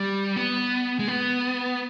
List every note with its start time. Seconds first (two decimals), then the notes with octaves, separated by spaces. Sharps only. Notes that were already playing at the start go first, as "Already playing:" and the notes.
Already playing: G3
0.36 B3
0.99 G#3
1.08 B3